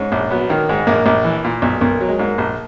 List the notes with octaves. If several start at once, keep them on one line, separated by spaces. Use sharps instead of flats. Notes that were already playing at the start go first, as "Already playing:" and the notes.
Already playing: G#2 C#4
A#1
F#3 B3
D#3 A#3
G#2 G#3
A#1 A#3
A#1
E3
A#2
B1
B1 A#3
F#3
G#3
G#2 A#3
A#1